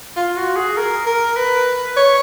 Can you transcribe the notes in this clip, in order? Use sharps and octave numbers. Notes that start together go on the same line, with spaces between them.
F4
F#4
G#4
A#4
A#4
B4
C#5